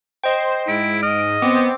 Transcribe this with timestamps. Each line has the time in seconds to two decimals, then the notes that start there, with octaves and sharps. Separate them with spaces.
0.24 C5 D#5 G5
0.67 G#2 E4 D7
1.03 D#5 F6
1.42 B3 C4 D6